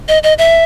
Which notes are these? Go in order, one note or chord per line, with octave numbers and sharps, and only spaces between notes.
D#5
D#5
E5